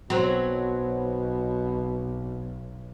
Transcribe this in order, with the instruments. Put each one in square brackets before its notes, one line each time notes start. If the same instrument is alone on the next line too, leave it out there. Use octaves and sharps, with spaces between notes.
[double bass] B1 [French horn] B2 [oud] F#3 C4